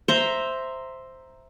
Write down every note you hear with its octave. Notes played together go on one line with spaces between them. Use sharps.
C5 E5 A#5